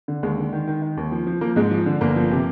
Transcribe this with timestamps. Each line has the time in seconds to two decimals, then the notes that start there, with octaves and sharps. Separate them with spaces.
0.08 D3
0.23 D#2 G#3
0.38 D3
0.53 D#3
0.67 D#3
0.82 D#3
0.97 D#2
1.12 F3
1.27 F3
1.41 F3 A#3
1.56 G#2 G#3
1.71 F3
1.86 D3
2.01 G1 A#3
2.16 F3
2.31 C3